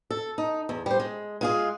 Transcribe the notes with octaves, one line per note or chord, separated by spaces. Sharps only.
A4
D#4
E2
G3 C5
G#3
G#3 F4 G#4